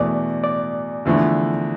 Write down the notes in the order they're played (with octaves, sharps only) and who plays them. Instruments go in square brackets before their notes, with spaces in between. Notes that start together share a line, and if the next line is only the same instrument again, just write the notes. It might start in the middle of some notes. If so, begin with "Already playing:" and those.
Already playing: [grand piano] E2 B2 A3 [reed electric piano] D5
[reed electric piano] D5
[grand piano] E2 D3 F3 A3 E4